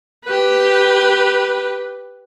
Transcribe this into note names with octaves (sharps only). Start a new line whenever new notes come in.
G4 B4